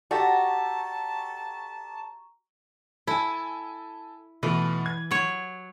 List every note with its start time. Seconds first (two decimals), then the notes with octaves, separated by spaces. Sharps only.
0.11 F#4 G4 A4 D5 A5 A#5 C#6
3.07 E4 A4 G#5
4.43 B2 E3 A3 F4
4.86 G#6
5.11 F#3 C#5